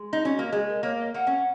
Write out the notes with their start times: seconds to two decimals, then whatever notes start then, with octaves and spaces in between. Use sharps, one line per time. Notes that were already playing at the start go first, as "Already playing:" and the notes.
Already playing: G#3
0.13 D#4
0.21 C#4 F#4
0.37 A#3 F#4
0.52 G#3 G#4
0.68 A#4
0.83 A#3 C#5
0.98 D#5
1.14 A#3 F#5
1.27 C#4